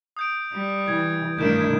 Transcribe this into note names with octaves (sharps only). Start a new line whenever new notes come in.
D#6 G6 D7
G3
E3 G#6
G2 D#3 A3 D4 E4 G6 E7